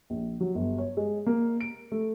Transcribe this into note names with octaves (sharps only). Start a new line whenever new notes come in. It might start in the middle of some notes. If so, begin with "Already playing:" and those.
A#1
F#3
G1
C#5
G#3
A#3
D7
A3